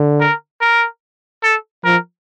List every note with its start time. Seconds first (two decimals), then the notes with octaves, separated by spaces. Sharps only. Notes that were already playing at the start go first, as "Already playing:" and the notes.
Already playing: D3
0.20 A#4
0.61 A#4
1.43 A4
1.84 F3 A#4